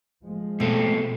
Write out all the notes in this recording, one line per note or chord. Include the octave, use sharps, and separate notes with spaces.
F3 G#3
B2 A3 C4 A4